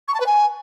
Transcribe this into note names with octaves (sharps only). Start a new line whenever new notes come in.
C#6
A5
B4
G#5